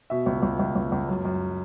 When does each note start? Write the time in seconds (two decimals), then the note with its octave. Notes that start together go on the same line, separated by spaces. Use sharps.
0.10 B2 E5
0.26 C#2
0.43 C#2
0.59 C#2
0.76 C#2
0.92 C#2
1.08 F#2
1.25 F#2